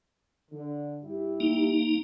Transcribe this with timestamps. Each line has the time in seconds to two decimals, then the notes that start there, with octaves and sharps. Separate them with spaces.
0.51 D3
1.02 G2 E4 G4
1.40 A#3 D#4